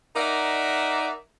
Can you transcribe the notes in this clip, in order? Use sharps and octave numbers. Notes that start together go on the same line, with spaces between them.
D#4 A#4 D5 E5 F#5